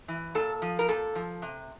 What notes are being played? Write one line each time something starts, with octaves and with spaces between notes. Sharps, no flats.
E3
A#2 A4
F3
A#4
A#2 A4
F3
C3